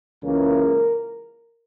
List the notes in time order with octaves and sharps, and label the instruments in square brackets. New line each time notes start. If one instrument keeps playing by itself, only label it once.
[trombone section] C#2 C#3 E3 A#3 A#4